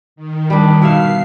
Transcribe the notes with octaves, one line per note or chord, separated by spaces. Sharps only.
D#3
G3 D4
B2 E5 F5 C7